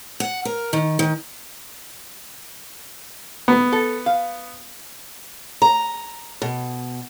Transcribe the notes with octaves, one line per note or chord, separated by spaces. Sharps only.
F#5
A#4
D#3
D#3
B3
A4
F5
A#5
B2